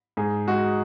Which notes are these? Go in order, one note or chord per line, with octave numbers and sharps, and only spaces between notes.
G#2 G#4
G#3 F#4